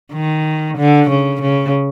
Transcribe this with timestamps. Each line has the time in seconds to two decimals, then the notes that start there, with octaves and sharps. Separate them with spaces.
0.13 D#3
0.77 D3
1.10 C#3
1.42 C#3